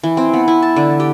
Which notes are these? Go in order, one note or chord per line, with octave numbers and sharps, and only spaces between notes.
E3
C4
B3
E4
A5
D3
G4